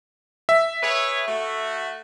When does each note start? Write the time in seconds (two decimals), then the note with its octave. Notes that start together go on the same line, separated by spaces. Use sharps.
0.49 E5
0.82 G#4 B4 C#5
1.27 A3 F#4